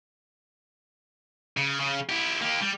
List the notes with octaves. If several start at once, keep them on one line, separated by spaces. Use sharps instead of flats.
C#3
C#3
E4 G4
A#3 G4
G3